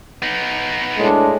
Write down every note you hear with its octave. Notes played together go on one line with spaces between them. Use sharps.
B3 D#4
A2 G#3 D4